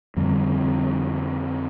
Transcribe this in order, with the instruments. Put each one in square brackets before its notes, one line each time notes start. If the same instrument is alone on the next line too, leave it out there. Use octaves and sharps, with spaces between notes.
[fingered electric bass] F2 D3 G3 C4